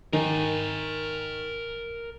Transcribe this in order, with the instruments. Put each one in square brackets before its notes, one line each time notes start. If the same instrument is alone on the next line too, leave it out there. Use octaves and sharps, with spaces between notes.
[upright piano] D#3 [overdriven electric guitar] A#4 G#5